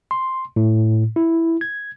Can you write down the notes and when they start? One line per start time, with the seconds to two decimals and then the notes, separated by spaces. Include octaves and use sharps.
0.11 C6
0.56 A2
1.16 E4
1.61 G#6